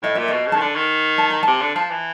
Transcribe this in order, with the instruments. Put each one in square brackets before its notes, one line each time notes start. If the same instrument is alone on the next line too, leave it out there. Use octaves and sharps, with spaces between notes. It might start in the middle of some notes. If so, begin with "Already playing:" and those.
[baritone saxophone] A2 [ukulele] D#5
[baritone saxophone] A#2 [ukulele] E5
[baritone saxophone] B2 [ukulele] D#5
[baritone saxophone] C#3
[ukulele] A5
[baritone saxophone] D#3
[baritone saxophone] D3 [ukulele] G#5
[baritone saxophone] D#3
[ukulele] A5
A#5
[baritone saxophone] C3 [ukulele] A5
[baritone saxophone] D3
[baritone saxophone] F3 [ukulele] A5
[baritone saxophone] E3